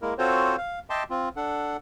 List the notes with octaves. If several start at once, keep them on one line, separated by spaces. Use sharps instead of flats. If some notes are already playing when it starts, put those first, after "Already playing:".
G#3 A#3 E4 A#4
C4 F4 F#4 A4 C5 C#5
F5
D#5 E5 G5 A5 C6 D6
C4 F4
D4 A4 F#5